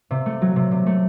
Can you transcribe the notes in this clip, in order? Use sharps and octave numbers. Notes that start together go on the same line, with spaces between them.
C3
A3
F#3
C3
C3
A3